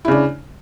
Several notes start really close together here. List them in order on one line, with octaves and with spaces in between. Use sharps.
E4 C#3 D4